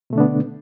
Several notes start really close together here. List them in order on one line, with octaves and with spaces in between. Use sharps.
B2 A3 D3 D4 B3